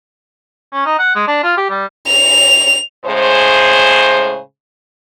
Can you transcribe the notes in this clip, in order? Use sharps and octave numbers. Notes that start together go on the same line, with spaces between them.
C#4
D#4
F#5
G#3
D4
F4
G4
G3
F7
A2 C#3 G#3 G#4 C5